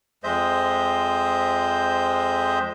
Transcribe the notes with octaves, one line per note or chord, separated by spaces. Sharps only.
F2 G#3 C5 D#5 E5 G6